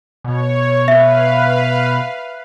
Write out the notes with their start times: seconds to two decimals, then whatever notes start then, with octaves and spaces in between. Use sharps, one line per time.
0.24 B2 C#5
0.88 B4 E5 F5